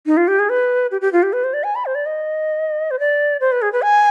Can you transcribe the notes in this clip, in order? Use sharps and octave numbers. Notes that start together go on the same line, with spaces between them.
D#4
F4
G4
G#4
B4
G4
G4
F4
G4
B4
C5
D5
G#5
B5
C5
D5
D#5
C5
D5
C5
B4
G#4
B4
G#5